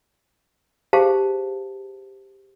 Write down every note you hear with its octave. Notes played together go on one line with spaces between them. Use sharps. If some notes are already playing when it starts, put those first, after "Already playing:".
G4 G#4 C5 F5 A5